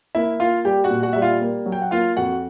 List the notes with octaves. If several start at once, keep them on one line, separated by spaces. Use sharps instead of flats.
A#3 E4 E5
A#3 F4 F5
G3 G4 G5
F#4 F#5
A#2
F#4 F#5
G3 E5
F4 F5
A#3
F#3
G5
F#5
A#3 F4 F5
F2 F#4 F#5